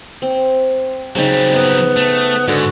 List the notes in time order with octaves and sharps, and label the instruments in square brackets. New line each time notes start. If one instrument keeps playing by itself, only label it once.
[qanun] C4
[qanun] C#3 C4 D#4 [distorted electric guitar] F#3 G3
[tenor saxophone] B3 [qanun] D#5
[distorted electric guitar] A3
[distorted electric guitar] G#2 [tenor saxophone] D3 [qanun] F#4